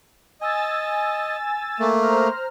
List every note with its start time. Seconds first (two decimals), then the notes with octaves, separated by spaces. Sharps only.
0.41 D#5 G#5 E6 A6
1.80 A3 A#3
2.02 C5 A#5 F6